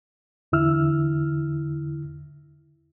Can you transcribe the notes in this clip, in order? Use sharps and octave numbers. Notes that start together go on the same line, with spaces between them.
E2 D3 E4 E6 F6